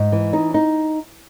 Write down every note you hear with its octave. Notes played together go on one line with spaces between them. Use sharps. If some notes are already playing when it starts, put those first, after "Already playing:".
Already playing: G#2
E3
D#4
D#4